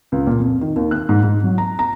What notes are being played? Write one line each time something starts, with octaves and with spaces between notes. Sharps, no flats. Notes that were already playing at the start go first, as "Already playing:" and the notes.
C#2
A#2
F2
D#3
D#2
F#6
G#2
G#2
F#3
A#5
A#5